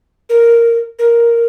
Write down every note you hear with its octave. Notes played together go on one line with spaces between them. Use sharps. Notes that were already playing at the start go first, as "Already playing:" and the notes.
A#4
A#4